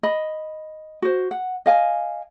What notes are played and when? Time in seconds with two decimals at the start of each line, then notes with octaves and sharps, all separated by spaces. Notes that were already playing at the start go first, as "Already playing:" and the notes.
0.03 D#5 B5
1.02 F#4 C5
1.31 F#5
1.66 D#5 F5 G#5